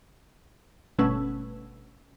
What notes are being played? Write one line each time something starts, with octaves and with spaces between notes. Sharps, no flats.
G1 B2 A3 C#4 B4 E6